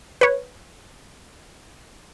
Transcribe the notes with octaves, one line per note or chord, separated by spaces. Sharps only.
B4 C#5